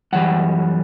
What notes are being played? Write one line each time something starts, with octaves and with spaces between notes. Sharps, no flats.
F#2 E3 G3 F#5